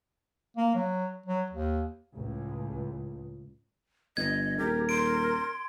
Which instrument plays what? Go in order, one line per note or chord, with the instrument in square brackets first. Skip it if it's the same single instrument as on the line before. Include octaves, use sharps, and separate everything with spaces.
[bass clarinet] A#3
F#3
F#3
D#2
[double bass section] C#2 A2
[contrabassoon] G1 [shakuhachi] D#5 [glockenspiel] G#6
[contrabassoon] D#1 [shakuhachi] G4 [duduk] A#4
[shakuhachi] C6 [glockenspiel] D7